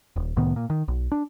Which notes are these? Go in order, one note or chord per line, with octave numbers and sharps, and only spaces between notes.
D#1
C2 A2 D#3 B3
A#2
D#3
B1
D4